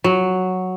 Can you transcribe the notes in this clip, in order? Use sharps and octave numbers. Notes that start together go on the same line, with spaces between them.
F#3